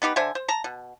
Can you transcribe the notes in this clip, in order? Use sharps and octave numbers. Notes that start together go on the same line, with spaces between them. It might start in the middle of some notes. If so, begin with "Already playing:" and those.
B3 D#4 G4 B4
D3 C5 E5 G#5
C5
A5 A#5
B2